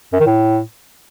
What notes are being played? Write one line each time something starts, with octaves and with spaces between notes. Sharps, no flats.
F#2
D#3
A2